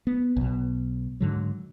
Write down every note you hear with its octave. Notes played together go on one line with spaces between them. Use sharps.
B3
B1 B2
G#2 D3 F#3